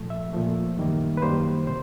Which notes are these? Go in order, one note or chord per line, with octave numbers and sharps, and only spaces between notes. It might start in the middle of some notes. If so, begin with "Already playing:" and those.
Already playing: A#2 F3 A3
E5
A#2 F3 A3
F#2 D#3 G3 A#3
B4
F#2 D#3 G3 A#3 C5
C3 C5